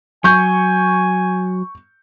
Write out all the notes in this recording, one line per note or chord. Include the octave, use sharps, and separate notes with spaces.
F#3 G#5 C#6 G6